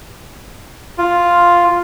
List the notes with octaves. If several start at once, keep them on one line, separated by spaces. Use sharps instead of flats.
F4